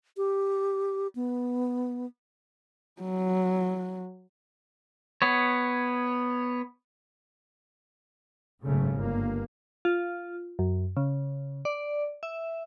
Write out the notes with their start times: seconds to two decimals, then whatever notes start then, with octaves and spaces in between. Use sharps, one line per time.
0.17 G4
1.15 B3
3.02 F#3
5.22 B3 C#5
8.64 F#1 G#2 C#3 A3
8.96 G1 A#3
9.85 F4
10.59 F#2
10.97 C#3
11.65 D5
12.23 E5